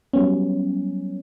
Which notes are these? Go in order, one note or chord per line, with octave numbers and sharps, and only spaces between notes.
F#3 G3 B3 C#4